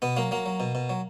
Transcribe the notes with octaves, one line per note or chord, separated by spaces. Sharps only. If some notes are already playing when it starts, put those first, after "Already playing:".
B2 B3
F#3 A#3
F#3 A#3
F#3
B2
B2
F#3